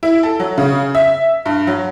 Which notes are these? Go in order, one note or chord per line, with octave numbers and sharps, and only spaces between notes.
E4
A4
F#3
C#3
E5
G2
F#3